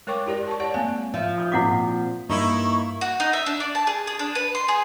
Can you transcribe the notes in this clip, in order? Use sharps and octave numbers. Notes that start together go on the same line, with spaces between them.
G#3 A#4 C#5 G5 C#6 D6
E4 G4 A#4 D5
A5 C#6
C#5 D5 F#5 A5
G#3 A#3 C4 F5 G#5
F3 E5
D#6 G6
A#2 C4 E4 F#5 D6 B6
G2 A#3 D#4 E4 C#6
F#4
D#4
E5
D4
D5
A5
G#4
G#4
D4
B4
C6
G#4